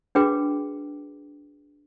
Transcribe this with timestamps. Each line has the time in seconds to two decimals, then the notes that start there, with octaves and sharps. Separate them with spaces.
0.15 D4 F#4 G#4 B4 G5 D6